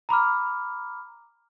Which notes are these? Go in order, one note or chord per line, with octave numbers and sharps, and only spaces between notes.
A#5 B5 D6 F6